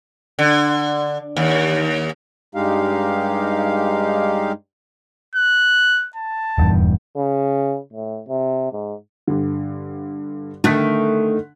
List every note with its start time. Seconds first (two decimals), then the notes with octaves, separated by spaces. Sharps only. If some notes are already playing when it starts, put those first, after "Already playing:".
0.39 D3
1.37 D#2
2.55 G2 G#3 D#4 G4 F5
5.35 F#6
6.16 A5
6.58 D#1 E2 G2
7.16 C#3
7.93 A2
8.29 C3
8.73 G#2
9.28 G2 D3
10.64 D3 D#3 A3 F#6 B6